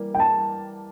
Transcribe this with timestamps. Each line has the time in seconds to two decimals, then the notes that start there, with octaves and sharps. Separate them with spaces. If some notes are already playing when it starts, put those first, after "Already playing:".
Already playing: E3 G3 A#3
0.14 G5
0.20 A5